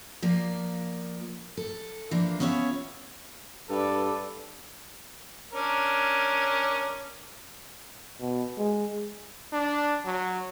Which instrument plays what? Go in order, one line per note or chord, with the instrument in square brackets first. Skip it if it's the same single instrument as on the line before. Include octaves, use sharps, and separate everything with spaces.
[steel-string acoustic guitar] F3 A#3 D5
A4
E3 F3 A#3 D4
B3 C#4 F4 C#5 D5 E5
[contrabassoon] G2 [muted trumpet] A4 [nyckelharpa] B4 D5
[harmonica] C#4 D4 A#4
[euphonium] B2
G#3
[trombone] D4
F#3